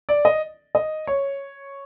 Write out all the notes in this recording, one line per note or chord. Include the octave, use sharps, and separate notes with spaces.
D5
D#5
D#5
C#5